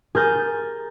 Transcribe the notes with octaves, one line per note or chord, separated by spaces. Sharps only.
G#4 A#4 G6 A6